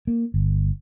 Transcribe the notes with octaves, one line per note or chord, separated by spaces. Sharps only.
A#3
G1